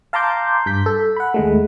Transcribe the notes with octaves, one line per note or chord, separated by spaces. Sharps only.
F5 A5 A#5 C6 D6 G6
G2 G6 B6
A4
F#5 B5
D#2 G#3 A3